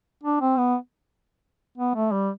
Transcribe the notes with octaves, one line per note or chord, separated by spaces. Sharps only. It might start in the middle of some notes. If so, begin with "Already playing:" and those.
D4
C4
B3
B3
A3
G3